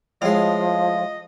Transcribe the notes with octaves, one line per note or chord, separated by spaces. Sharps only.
A2 F3 G#3 D#5 F5